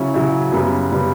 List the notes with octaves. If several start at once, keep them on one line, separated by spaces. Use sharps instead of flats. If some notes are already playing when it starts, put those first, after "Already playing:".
Already playing: C#3 F#3 C#4 E4
C#3 F#3 C#4 E4
F#2 C#3 G3 B3
C#3 G3 B3